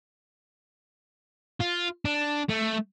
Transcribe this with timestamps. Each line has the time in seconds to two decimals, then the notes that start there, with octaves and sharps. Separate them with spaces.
1.61 F4
2.05 D4
2.49 A3